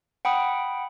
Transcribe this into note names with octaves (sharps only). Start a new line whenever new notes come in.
F#5 G5 B5 D#6